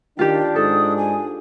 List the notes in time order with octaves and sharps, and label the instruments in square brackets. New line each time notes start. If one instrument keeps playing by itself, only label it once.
[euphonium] D#3 [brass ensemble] D4 [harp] F4 G4 [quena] G5
[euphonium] G#2 [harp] A4 [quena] D#6
[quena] G#5